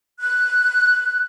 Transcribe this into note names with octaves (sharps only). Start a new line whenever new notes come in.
F#6